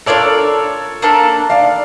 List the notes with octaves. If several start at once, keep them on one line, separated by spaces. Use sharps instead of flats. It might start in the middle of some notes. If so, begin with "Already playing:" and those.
D4 F4 A4 A#4 C#5 D5
A#3 D4 A4
D5 F5